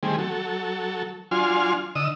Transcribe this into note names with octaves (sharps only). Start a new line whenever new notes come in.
D#3 G3 A3 C4 G#4
F#3 A4
F#3 D4 F4 G#5 C6 F6
D3 D#5 D#6 E6